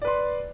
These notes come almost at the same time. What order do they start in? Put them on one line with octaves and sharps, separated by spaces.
D5 B4 C6